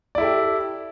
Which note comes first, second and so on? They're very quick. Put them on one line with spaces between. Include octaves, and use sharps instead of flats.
D5 E4 A4 G4